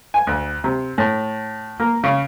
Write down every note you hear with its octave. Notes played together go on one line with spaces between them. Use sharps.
G#5
D2
C3
A2
A#3
C#3